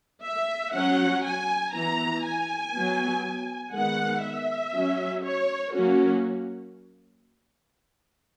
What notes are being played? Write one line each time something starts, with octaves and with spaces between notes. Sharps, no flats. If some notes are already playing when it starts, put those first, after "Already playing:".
E5
F#3 C#4 F#5
G#5
E3 B3 A#5
G#5
F#3 B3
D#3 G#3 B3 F#5
E5
F#3 C#4
C#5
F#3 A#3 C#4 F#4